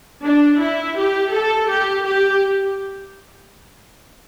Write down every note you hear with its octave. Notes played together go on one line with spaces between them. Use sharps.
D4
E4
G4
A4
G4
G4